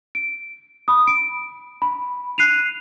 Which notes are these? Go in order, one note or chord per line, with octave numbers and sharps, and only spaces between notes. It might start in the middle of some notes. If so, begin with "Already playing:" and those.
D7
B5 D#6
D7
B5
F#6 C7 D#7 F7